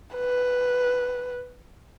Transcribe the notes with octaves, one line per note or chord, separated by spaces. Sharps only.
B4